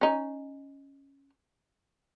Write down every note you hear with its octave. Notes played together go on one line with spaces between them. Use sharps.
C#4 D#4